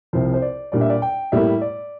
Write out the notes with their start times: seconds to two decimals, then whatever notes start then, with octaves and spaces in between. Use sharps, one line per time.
0.13 C2 C3 F3 C5
0.34 C5
0.42 D5
0.72 A#2 G3 D4 D5
0.81 E5
0.90 D5
1.02 G5
1.32 A2 G3 A#3 E4 E5
1.61 D5